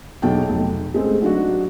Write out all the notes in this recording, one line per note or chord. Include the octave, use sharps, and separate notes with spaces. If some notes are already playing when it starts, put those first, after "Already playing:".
B1 E2 F#3 G5 A5
F1
G#3 A3 C4 C#4
F#3 D4 D#4 F#4